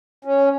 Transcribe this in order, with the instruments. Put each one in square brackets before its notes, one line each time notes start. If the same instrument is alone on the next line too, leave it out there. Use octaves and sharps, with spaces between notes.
[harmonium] C#4